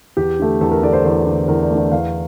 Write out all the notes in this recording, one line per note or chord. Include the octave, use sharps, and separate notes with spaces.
E2 G4
D3 A3
E2 A4
A#4
D3 A3 D5
C5
E2 C5
D3 A3
E2 A#4
D5
A3
D3 D5
E2 F5